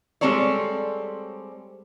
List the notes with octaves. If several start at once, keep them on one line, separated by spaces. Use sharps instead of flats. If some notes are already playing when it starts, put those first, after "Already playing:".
G3 G#3 C4 A4 C#5 D5